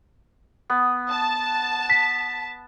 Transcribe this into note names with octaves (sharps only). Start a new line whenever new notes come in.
B3
A5
B6